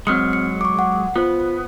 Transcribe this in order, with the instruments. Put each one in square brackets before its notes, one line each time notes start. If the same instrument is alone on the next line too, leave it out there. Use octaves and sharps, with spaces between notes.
[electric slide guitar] F#3 G#3 [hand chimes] C4 F6 C#7
[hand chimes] C#7
C#6 D6
F#5
[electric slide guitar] B3 [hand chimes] F4 C5